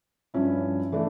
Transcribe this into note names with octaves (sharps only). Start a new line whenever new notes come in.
G2 F3 C#4 E4
E3 A3 D4